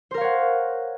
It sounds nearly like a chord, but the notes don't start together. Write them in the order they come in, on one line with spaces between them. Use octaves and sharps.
C5 A#4 F5 C#5 F#5